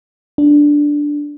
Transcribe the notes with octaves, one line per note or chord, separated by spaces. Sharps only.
D4